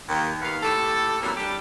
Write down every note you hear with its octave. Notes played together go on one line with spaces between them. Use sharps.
D#2
D#2 D#3 B3 F5
A2 G4 A4
E3 F#3 G3 A#3 C4
G3 A3 D4 G4